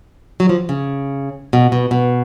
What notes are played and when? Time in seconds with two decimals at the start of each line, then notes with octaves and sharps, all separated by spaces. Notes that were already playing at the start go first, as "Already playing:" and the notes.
0.40 F#3
0.49 F3
0.69 C#3
1.53 B2
1.72 B2
1.91 B2